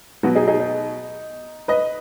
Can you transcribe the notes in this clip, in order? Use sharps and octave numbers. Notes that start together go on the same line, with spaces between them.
B2 F#3 B3 F#4
D#4 G#4
D#4 G#4
D#4
B4 D#5